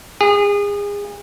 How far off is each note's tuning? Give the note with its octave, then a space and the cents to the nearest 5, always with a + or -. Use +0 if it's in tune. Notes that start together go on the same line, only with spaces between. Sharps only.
G#4 -30